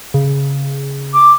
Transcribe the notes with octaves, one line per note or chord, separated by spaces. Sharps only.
C#3
D6